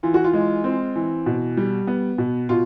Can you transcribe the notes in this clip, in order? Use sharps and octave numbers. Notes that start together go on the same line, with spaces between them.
E3 F4
F#4
F4
G#3
C4
E3
B2
G3
B3
B2
B2 F4